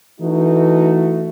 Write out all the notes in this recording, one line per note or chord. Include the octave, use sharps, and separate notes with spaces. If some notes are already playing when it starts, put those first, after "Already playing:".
E3 A3 D#4 F#4